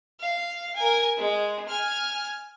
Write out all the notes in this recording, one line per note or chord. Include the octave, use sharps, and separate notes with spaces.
F5
A#4 G#5
G#3
G#5 F6